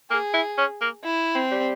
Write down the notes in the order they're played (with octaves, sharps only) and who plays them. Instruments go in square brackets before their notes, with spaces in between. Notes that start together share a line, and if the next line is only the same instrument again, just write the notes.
[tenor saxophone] A#3 [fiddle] G#4
[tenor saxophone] E4
C#4
A#3
[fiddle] E4
C4
[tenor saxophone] G3